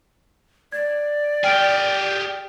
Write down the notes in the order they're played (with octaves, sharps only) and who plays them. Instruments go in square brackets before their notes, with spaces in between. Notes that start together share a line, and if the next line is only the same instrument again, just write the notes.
[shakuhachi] D5 [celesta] G#6
[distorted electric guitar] G4 G#4 [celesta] G5 F6 D7